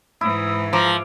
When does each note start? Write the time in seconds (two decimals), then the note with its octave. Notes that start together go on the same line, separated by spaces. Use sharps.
0.21 G#2 E3 E4 D#6
0.73 F3 A#5 D6